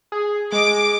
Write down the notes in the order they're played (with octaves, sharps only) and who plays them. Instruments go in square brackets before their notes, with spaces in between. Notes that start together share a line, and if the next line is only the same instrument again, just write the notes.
[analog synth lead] G#4
[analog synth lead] G#3 [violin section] D6